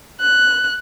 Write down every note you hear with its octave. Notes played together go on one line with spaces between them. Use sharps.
F#6